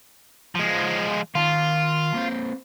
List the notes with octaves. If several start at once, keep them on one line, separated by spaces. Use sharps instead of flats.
F3 G#3
D#3 F4 A5
A#3 C4 C5